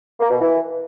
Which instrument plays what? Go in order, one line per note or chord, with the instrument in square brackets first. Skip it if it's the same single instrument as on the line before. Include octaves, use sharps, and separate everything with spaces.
[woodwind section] A#3
B2
E3